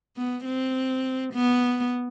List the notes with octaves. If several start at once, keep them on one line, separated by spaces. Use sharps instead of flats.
B3
C4
B3